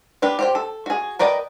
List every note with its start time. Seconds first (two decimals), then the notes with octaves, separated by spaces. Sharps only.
0.22 D4 G4 B4
0.39 G4 C5 G5
0.55 A4
0.86 F#4 G#4
1.19 A#4 B4 D5 D#5 G5